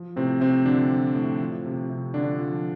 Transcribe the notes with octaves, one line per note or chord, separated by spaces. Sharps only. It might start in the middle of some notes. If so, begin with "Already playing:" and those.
Already playing: F3
A2 C3 C4
A2 C3 C4
D3 F3 D4
F3
A2
F3
C3
C3
D3 F3 D4
F3